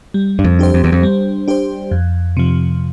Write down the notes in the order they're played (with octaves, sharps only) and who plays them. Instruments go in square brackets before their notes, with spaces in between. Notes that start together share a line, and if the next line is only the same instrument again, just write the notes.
[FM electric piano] G3
[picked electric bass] G2
F2
[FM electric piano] D4 G4 C5
[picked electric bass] F2
E2
F2
[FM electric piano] G3
D4 G4 C5
F2
C3 F3